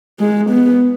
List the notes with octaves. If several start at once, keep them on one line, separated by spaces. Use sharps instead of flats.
G#3
B3